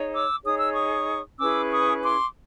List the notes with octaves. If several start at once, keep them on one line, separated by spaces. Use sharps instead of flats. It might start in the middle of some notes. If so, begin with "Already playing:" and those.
Already playing: D#4 G#4 C#5
D6 E6
D#4 G#4 C#5 D#6
E6
C#6 D#6
C#4 E4 G#4 B4 D6 E6
C#6 D#6
C6 D6